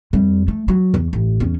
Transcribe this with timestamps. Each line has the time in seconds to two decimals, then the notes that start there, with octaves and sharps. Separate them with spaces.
0.13 F2 G3
0.48 A3
0.68 F#3
0.94 E2
1.13 A1
1.40 E2 C#4